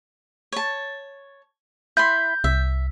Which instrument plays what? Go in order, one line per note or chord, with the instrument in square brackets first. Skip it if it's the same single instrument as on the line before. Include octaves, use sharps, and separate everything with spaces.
[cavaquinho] C#5 A5
[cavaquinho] E4 B5 C6 [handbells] G6
[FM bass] C2 [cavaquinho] E5